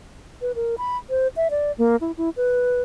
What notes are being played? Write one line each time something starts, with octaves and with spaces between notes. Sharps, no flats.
B4
A#4
B5
C5
E5
D5
A#3
E4
E4
B4